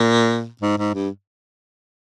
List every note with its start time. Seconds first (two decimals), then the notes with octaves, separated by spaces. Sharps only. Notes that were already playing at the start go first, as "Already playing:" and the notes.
Already playing: A#2
0.61 G#2
0.78 G#2
0.94 G2